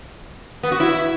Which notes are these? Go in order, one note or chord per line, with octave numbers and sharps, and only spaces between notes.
B3
F#4
E4